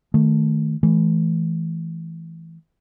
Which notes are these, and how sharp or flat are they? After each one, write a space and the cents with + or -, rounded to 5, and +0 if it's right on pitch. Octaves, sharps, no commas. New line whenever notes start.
D#3 +0 A3 +0
E3 +0 A3 -30